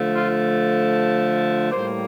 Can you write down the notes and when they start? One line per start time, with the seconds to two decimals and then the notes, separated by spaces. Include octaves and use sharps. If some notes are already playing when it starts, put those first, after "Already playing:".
Already playing: D3 F3 A3
0.15 F4
1.71 A2 G3 A#3 C5